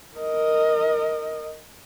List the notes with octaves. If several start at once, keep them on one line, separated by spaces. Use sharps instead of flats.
A#4 D#5